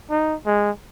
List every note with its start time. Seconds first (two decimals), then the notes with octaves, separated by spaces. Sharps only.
0.10 D#4
0.46 G#3